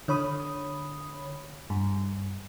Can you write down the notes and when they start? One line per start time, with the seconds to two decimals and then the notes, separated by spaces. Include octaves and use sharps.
0.08 D3 C#5 B5 D#6
1.70 G2